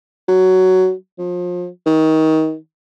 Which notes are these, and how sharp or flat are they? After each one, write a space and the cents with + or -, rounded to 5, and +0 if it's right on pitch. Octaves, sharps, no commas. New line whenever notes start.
F#3 +10
F3 +30
D#3 +25